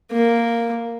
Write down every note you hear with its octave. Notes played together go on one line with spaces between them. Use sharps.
A#3